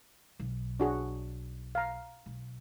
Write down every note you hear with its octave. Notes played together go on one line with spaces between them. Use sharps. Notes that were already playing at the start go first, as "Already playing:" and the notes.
B1
D4 F#4 G#4
F5 A#5
B1